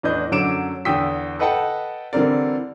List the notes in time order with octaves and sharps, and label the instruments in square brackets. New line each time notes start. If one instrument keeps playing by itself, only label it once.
[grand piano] E2 A2 D4 B4 D#5 G6
F#2 D3 F#3 D6 D7 E7
E2 D3 G5 D#6 E6 B6
A4 B4 D#5 F#5 G5 A5
D3 E3 G3 C4 A#4 D5